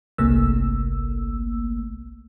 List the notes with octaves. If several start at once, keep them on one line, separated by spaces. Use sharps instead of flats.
G1 C2 C3 A3 A#3 E6